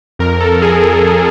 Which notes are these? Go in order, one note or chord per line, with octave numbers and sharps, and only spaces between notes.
F2 A#4
A4
F2
G#4